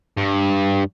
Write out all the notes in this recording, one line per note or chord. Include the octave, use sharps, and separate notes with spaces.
G2